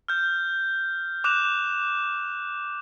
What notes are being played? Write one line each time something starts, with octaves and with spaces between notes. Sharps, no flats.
F6 G6
D6 F#6 E7 F7